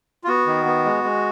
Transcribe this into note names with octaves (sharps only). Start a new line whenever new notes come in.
F4
B3 F#4
D#3
B3
G#3
G#3